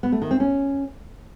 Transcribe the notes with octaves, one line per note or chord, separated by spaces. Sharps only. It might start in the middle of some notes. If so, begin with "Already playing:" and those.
B3
A3
D#3
C4
C#4